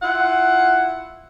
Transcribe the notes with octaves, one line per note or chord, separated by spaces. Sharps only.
E4 F4 F#5